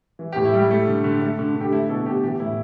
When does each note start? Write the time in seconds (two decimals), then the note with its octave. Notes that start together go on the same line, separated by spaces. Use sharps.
0.19 E3
0.32 G4
0.36 A2
0.45 E4
0.54 G3 G4
0.71 A3
0.88 D3
1.04 D3
1.22 A3
1.39 D3
1.56 D3 G4
1.72 A3 E4
1.89 B2 A4
2.06 B2 G4
2.23 E3 G4
2.40 A2 E4